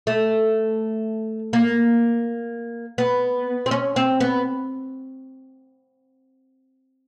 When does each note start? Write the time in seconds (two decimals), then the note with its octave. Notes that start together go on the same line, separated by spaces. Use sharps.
0.07 A3
1.53 A#3
2.98 B3
3.66 C4
3.71 C#4
3.96 C4
4.20 B3